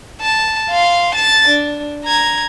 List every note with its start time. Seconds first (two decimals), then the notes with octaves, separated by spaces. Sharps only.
0.21 A5
0.71 F5 C6
1.14 A5 A6
1.48 D4
2.05 A#5 G#6